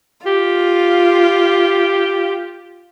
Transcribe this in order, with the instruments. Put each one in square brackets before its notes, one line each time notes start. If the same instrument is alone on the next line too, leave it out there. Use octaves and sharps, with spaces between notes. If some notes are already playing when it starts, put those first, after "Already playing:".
[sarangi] F4 [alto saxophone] G4